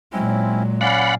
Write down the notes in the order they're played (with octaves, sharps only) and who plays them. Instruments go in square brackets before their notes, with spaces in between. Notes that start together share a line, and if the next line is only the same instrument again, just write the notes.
[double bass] A#2 F#3 [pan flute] G#3 [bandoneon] C4 C#4 E4
[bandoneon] C#4 D5 F5 [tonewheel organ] F#5 B5